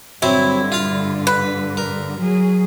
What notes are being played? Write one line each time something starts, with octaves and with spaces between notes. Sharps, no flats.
G2 D3 F#3 C4 E4
F4 F5
B4
A#4
F#3 G#4